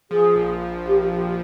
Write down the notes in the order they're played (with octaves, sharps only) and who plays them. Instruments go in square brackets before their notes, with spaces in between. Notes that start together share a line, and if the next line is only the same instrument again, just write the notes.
[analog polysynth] F3 [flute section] G#4
[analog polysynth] A#1
A#1
[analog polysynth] A#1 [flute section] G4
[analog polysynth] A#1 [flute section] G4